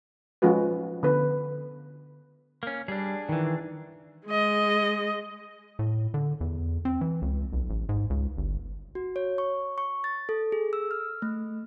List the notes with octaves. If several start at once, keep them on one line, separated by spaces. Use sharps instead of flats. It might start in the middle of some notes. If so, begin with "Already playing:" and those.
F3 G#3 C#4 F4 F#4 B4
D3 B3 B4
A#3 C#4
G3 D4 G#4
D#3 E3
G#3 D#5
A2
D3
E2
C4
E3
C#2
B1
A1
G#2
C#2
G1
F#4
C#5
C#6
C#6
A6
A4
G#4
E6
F6
A3